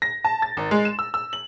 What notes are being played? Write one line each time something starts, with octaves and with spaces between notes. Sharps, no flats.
A#6
A5
A6
G#1
G#3
E7
E6
E6
F#7